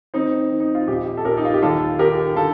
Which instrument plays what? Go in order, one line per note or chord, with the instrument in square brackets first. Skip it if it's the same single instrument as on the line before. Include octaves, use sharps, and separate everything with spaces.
[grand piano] D#3 C4 D#4
D#3
D#4
F4
A#1 D#4 G4
A4
A#1 G4 A#4
D#4
F4
G4
D#2 F4 A4
D#3 G4 A#4
D3 F4 A4